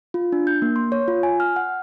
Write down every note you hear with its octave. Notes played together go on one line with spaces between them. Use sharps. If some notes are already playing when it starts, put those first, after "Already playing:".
F4
D4
G6
A#3
C6
C#5
F4
G#5
F6
F#5